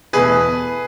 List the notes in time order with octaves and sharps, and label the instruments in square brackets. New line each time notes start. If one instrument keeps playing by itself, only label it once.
[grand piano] E2 B2 A3 G#4 B4